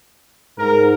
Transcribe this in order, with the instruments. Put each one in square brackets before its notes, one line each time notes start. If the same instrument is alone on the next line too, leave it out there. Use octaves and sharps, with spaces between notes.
[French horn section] G#2 [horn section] A#4